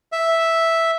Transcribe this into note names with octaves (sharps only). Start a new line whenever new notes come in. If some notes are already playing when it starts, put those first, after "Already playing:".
E5